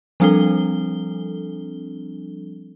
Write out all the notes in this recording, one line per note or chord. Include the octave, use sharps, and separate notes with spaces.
F3 G3 C4 D4 A4 G7